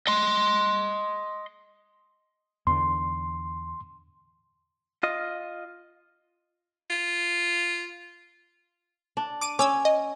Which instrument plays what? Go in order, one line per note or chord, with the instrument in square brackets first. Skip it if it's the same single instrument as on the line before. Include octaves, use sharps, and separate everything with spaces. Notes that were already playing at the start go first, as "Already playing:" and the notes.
[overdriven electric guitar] D#5 C6
[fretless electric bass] E2 D3 [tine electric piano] C6
[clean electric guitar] F4 D#5
[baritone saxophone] F4
[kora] D4
[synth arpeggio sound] D6 D7 D#7
[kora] C#4 [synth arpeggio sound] D6 E6 G#6
[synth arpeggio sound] D#5